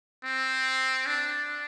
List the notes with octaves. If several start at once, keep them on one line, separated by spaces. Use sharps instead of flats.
C4
D4